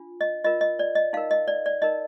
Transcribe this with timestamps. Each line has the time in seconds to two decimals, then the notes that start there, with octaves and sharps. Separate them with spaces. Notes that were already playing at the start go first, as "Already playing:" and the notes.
Already playing: D4 F4
0.21 D#5
0.44 F4 A#4 D#5
0.61 D#5
0.79 D5
0.95 D#5
1.13 D#4 F5
1.17 A#4
1.31 D#5
1.48 D5
1.66 D5
1.82 D#4 A#4 D#5